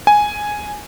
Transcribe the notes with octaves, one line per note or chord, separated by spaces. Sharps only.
G#5